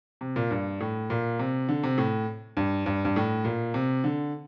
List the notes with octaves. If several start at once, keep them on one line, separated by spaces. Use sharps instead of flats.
C3
A#2
G2
A2
A#2
C3
D3
C3
A2
G2
G2
G2
A2
A#2
C3
D3